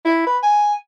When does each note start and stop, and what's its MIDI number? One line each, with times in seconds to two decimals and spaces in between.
0.05 0.25 64
0.26 0.38 71
0.43 0.74 80